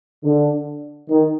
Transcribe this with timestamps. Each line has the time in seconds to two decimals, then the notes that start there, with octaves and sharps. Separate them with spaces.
0.24 D3
1.09 D#3